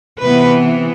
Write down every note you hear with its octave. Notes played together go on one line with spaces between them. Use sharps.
C3 E3 B3 B4